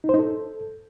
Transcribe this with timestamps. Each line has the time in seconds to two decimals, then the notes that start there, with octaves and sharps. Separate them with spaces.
0.04 D#4
0.09 C5
0.14 D#4
0.19 A4